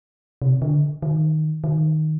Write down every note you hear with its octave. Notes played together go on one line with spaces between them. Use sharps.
C3
D3
D#3
D#3